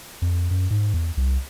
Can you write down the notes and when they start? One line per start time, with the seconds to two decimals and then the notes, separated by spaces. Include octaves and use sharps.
0.22 F2
0.51 F#2
0.71 G#2
0.94 E2
1.17 C2